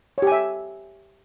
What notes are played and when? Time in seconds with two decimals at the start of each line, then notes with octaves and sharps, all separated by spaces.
0.18 C#5
0.22 G4
0.27 G#5
0.32 E5